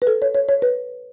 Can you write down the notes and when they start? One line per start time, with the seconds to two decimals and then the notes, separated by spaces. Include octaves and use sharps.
0.02 B4
0.07 A4
0.22 C#5
0.35 C#5
0.49 C#5
0.62 B4